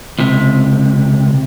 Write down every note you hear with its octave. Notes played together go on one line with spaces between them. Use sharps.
C#2 C3